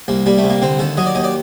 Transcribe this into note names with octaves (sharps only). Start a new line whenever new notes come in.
C2 A#3
G3 A#3
A3
C2
A#3
D3 C4
D#2 A4
F#3 D#5
D5
D#2 D#5
D5